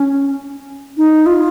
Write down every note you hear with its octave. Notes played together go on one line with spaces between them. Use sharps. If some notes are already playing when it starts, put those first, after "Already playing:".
Already playing: C#4
D#4
F4